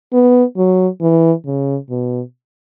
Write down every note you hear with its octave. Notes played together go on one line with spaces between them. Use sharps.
B3
F#3
E3
C#3
B2